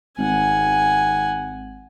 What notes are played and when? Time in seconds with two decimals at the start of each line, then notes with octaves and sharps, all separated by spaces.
0.18 G#1 F#5 G#5